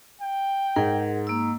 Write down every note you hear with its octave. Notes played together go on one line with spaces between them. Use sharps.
G5
G#2 G#4 A#4 F#5
A#3 E6